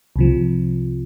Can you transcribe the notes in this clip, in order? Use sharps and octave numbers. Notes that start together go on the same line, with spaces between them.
C2 C3 F3